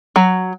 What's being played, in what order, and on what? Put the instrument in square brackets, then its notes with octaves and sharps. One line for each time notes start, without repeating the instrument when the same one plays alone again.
[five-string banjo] F#3